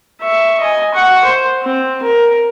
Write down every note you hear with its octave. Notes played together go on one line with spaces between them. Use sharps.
E5 C#6
D#5 G#5
F#5 C#6
C5
C4
A#4